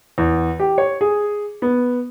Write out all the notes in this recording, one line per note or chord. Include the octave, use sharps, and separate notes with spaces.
E2
G4
C#5
G#4
B3